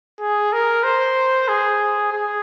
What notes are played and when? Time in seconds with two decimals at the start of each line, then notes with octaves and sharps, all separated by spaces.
0.20 G#4
0.53 A#4
0.83 C5
1.48 G#4
2.12 G#4